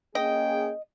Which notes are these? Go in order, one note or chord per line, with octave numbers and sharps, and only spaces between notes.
A#3 C#4 G#4 D#5 G5